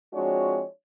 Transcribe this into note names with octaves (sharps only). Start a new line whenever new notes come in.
F3 G#3 C4 D4 F#4 C#5